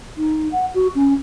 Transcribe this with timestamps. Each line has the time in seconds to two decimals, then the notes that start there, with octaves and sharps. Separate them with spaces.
0.17 D#4
0.52 F#5
0.74 F#4
0.95 C#4